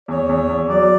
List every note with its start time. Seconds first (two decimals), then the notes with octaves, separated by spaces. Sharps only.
0.08 E2 C#5
0.29 E2
0.49 E2
0.68 F#3 D5